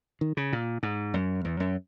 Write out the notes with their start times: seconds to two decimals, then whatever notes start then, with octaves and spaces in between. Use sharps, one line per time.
0.21 D#3
0.37 C#3
0.53 A#2
0.83 G#2
1.14 F#2
1.45 E2
1.60 F#2